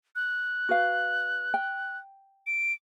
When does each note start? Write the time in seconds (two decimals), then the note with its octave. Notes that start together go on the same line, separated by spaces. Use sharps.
0.16 F#6
0.69 F#4 B4 F5
1.54 G5
2.47 D7